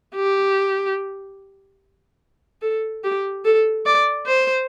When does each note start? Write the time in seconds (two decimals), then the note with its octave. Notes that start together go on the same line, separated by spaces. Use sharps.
0.15 G4
2.62 A4
3.04 G4
3.45 A4
3.86 D5
4.26 C5